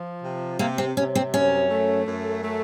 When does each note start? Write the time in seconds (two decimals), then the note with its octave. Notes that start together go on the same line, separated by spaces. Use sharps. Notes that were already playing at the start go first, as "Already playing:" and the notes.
Already playing: F3
0.23 C3
0.59 C3 A#3
0.78 C4
0.96 C3 C#4
1.15 C4
1.34 F#2 C#4
1.71 A3
2.07 F#2
2.44 A3